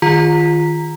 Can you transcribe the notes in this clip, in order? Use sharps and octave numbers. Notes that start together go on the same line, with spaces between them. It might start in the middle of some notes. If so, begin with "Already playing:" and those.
D#3 F4 A#5 B6